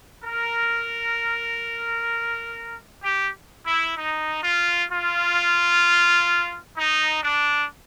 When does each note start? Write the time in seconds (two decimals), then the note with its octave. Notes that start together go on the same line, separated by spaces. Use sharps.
0.22 A#4
3.02 G4
3.66 E4
3.96 D#4
4.42 F4
4.90 F4
6.77 D#4
7.23 D4